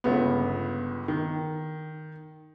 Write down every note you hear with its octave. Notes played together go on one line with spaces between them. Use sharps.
G1 C#2 B3
D#3